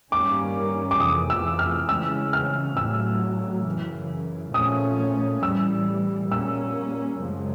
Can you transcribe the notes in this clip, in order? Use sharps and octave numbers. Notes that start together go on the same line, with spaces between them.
G2 D#3 G3 A#3 C#4 D6
D6
F2 C3 E3 D#6
E6
F6
C#3 E3 G#3 C#4 E6
F6
A2 F#3 A3 E6
F#2 C#3 E3
A#2 F3 A3 C#4 D#6
A2 E3 G3 E6
A#2 G3 A#3 C#4 E6
F#2 C#3 F3 G#3